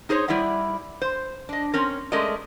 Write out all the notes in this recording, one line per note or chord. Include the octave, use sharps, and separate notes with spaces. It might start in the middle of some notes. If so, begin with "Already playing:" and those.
D#4 G#4 A#4 C5 C#5
G3 E4 D5 E5 F#5
C5
D4 D#5
C4 C#4 A#4
G#3 A3 C#4 A#4 D5 D#5